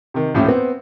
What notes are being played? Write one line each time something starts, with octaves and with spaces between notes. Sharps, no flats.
C3 D#3
D#1 A2 F3 C#4 E5
B3 C4